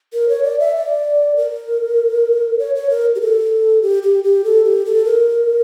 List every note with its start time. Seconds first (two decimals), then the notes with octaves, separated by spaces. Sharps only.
0.14 A#4
0.29 C#5
0.43 D5
0.59 E5
0.75 D5
1.36 A#4
2.59 C#5
2.75 C#5
2.90 A#4
3.15 G4
3.21 A4
3.82 G4
4.03 G4
4.24 G4
4.44 A4
4.64 G4
4.85 A4
5.05 A#4